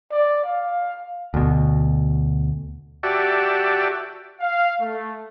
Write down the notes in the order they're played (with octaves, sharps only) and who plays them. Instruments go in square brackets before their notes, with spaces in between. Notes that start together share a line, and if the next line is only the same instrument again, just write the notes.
[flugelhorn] D5
F5
[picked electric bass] D2 B2
[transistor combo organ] F#4 G4 D5 E5 A5
[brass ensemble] F5
A3